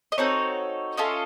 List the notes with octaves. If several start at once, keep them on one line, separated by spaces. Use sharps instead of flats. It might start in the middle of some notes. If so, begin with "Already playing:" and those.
D#5
C4 D#4 F#4 A4 C#5
C#4 F4 A4 D#5